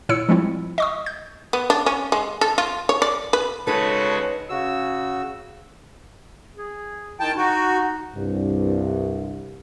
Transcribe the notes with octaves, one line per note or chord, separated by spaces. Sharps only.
A#2 E4 C#5 E6 C#7
F3 G3 G#3 C4 E4 F4
D#5 C#6 D#6
G6
B3
D4
C#4
G#3
A4
F4
C#5
D5
B4
C#3 G#3 D#4 F#4 A4 B4 C#5
C#3 F#4 E6
G#4
D#3 E4 G5 A5
D#4 F#4
C2 G2